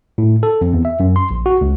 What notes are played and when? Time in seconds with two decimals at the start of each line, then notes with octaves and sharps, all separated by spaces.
0.18 A2
0.43 A4
0.61 F2
0.73 E2
0.85 E5
1.00 F#2
1.16 C6
1.31 A#1
1.46 F#4
1.61 C#2